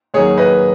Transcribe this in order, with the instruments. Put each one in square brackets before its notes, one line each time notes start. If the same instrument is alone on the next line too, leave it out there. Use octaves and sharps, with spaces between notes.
[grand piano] D#2 D#3 F#3 G#4 C#5
B4 D#5